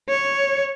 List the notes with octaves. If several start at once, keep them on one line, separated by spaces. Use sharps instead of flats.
C#5